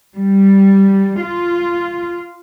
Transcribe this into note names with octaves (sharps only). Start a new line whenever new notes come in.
G3
F4